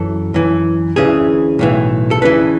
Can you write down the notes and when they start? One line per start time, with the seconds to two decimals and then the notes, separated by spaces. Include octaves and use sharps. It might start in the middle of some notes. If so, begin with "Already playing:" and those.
Already playing: F#2 E3 A4
0.34 F#2 E3
0.96 D2 C#3 E3 G#4
1.59 B1 A2 E3
2.11 A4
2.22 D2 C#3 E3 B4